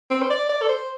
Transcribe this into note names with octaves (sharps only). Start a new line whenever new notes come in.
C4
C5
D5
D5
A4
C5